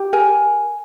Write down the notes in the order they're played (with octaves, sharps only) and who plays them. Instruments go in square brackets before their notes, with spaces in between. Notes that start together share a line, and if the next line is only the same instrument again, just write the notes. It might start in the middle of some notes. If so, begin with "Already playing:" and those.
Already playing: [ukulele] G4
A#4 G#5